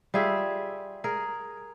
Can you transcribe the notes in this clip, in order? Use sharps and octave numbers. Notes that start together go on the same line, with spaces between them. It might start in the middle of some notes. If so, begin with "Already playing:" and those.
G3 F4 G#4 E5
G#4 A#4